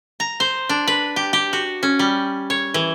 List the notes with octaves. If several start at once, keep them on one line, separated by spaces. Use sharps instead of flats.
A#5
C5
D4
B4
G4
G4
F#4
C#4
G3
C#5
E3